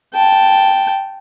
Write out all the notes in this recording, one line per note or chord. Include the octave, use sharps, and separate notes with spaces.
G5 A5